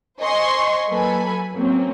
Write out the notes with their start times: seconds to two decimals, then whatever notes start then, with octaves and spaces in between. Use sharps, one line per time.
0.19 C5 D#5 G#5 C6 C#6 C7
0.89 F#3 A#3 A4 B4 G#5 B5
1.53 F#3 A#3 C4 C#4